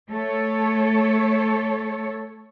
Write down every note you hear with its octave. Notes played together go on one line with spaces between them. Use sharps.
A3 A4 C#5